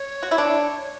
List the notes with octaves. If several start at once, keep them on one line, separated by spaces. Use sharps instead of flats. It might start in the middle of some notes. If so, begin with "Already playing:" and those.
Already playing: C#5
F#4
E4
D4